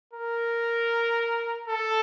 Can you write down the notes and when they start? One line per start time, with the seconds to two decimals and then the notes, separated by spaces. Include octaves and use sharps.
0.13 A#4
1.68 A4